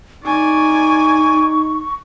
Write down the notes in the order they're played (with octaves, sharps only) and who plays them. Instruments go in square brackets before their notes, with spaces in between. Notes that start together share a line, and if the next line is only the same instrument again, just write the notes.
[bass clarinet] D#4 [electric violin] D5 G#5 [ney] C#6